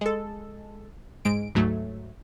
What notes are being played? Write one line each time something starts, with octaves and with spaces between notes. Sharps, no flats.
G#3 A4
G#2 G#3 D7
D2 G#2 F#3 A3